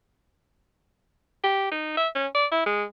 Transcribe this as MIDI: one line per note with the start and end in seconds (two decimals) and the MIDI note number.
1.43 1.68 67
1.71 1.97 63
1.97 2.08 76
2.15 2.27 61
2.35 2.46 74
2.52 2.66 64
2.66 2.83 56